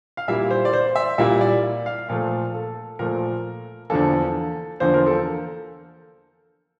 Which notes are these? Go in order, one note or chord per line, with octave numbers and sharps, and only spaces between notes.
F5
A#2 G3 A#3 E4 E5
C5
D5
C5
E5
A#2 G3 A#3 E4 E5
D5
F5
A#2 F3 A3 F5
A4
A#2 F3 A3 A#4
E2 D3 F3 A#3 A4
E2 D3 F3 A#3 C5
A#4
A4